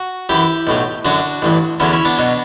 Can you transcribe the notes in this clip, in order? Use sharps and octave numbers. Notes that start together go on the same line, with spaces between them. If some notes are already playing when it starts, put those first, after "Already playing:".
Already playing: F#4
F#2 E3 E4 G4
B1 A2 F#3
F#2 D3 F#3 D4 F#4
A1 G2 E3
E2 D3 F#3 C#4 E4
C#4 E4
B3 D4
B2 F#3